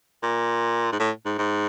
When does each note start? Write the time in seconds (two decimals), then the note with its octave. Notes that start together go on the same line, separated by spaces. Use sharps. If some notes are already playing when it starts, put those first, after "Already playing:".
0.23 A#2
0.92 G#2
1.00 A2
1.26 G#2
1.38 G#2